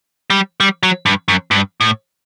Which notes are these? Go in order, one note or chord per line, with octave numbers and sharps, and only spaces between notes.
G3
G3
F#3
G2
F#2
G2
A2